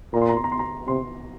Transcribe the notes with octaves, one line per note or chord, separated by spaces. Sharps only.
A#2 A#5
C6
A#5
C6
A#5
C6
A#5
C3 C6